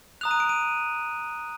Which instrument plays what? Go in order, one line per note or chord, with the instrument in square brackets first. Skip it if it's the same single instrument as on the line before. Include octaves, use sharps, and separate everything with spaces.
[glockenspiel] A#5 D#6 F#6 F7
D#7
D7
D#7